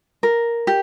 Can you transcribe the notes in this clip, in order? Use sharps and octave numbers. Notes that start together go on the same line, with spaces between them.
A#4
G4